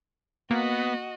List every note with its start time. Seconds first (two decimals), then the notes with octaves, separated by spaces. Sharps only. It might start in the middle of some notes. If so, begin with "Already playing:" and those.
0.51 A#3 B3 F#4 D#5